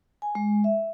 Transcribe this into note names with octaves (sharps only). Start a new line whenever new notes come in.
G#5
G#3
E5